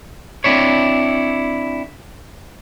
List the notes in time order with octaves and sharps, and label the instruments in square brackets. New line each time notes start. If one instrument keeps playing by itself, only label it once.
[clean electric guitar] C4 D4 E4 C#5